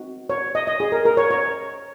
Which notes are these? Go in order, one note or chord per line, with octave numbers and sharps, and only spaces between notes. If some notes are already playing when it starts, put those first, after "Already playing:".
Already playing: C4 D#4 F#4
C#5
D#5
D#5
G#4
A#4
A#4
C#5
C#5